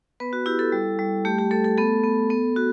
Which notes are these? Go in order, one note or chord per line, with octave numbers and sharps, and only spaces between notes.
B3 B4
F#4
E4 G4
A4
G3
G3
A3 G4
G4
A3 A4
A4
B3 A4
B3
B3
F#4